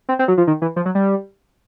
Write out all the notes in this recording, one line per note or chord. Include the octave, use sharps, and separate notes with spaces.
C4
C4
F#3
F3
D#3
E3
F3
F#3
G3